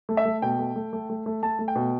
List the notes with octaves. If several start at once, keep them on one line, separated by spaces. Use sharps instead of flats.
A3
E5
A3
B2 G5
A3
A3
A3
A3
A3
A3 A5
A3
G5
B2